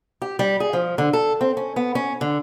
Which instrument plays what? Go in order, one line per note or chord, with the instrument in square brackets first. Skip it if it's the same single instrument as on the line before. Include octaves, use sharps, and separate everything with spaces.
[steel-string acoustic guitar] G4
G3
G#4
F3
D3
A4
C4
C#4
B3
C#4
D3